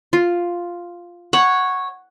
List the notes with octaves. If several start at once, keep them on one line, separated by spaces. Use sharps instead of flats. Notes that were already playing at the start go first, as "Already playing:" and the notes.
F4
C#5 F#5